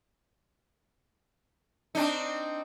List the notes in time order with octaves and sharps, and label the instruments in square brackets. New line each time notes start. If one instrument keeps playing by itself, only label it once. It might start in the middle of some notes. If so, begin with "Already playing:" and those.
[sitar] C4 D4 D#4